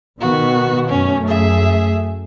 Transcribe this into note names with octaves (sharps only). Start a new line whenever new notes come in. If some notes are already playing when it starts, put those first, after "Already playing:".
B2 D#3 B3 F#4
F#2 A3 C#4
G#4 E5